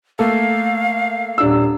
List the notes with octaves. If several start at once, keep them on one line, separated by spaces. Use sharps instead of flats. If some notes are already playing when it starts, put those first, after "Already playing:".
A3 A#3 A4 F5
D#1 D4 E6